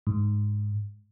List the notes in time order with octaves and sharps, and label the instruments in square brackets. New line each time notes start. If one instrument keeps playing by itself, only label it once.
[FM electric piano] G#2